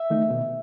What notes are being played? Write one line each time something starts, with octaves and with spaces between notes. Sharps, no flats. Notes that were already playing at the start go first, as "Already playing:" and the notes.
Already playing: E5
D#3 A3 D#4
B2